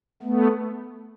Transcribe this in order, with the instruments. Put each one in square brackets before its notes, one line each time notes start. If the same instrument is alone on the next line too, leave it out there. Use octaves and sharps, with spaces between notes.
[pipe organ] A3 B3